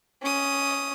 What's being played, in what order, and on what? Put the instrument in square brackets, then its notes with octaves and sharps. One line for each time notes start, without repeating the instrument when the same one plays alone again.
[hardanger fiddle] C#4 D#6